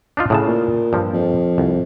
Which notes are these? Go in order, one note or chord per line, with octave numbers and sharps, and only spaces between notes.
D4 D#4 F4
A2 C#3 A5
A#2
G2 F3
F2
C2